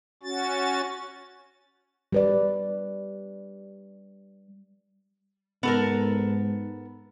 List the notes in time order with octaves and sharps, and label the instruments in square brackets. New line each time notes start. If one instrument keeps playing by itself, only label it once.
[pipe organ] C#4 F#4 A6
[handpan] G3 B4 D5
[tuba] G#2 [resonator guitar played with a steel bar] B3 A4 A#4